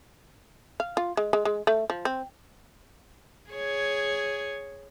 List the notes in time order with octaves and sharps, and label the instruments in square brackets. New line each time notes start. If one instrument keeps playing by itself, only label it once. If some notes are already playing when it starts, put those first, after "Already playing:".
[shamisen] F5
F4
G#3
G#3
G#3
A3
F3
C4
[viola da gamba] G#4 C#5